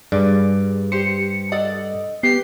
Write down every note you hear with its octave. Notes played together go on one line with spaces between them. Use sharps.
G2 G#4 D5
G4 C5 C#7
A4 D5 D#5 F#5
B3 G4 C7